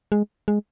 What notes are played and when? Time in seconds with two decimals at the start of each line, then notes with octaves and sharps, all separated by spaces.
0.12 G#3
0.48 G#3